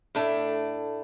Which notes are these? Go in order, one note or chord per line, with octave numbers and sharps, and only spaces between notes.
A2 A3 D4